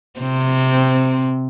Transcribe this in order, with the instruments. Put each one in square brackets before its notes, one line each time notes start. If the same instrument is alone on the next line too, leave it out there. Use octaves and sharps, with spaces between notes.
[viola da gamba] C3 C4